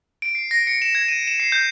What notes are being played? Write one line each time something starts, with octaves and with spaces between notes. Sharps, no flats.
D7
C7
A#6
C#7
E7
G#6
D#7
E7
C7
G6